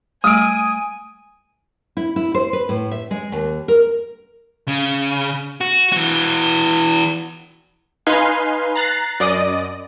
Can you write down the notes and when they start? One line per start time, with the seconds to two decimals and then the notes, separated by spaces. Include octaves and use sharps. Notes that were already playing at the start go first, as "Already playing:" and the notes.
0.24 G3 A3 G#5 D#6 D7
1.97 E4
2.16 E4
2.34 C5
2.53 B4
2.69 A2
2.91 E5
3.11 G#3
3.32 D#2
3.68 A#4
4.68 C#3
5.61 F#4
5.92 E3 F#4
8.07 D#4 B4 F5 G#5 C6
8.75 A#5 F#6 A6 C7
9.20 F#2 D5 D#5 D#6